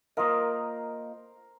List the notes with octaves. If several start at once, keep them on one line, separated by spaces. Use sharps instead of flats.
A#3 F4 A#4 C5 D#5